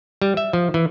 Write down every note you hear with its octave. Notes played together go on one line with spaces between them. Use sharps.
G3
E5
F3
E3